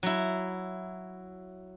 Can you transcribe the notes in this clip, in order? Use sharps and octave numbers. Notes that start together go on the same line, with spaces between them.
F#3 E4